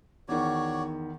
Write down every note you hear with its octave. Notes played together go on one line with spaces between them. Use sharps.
E2 D#3 F#4 C#5 D5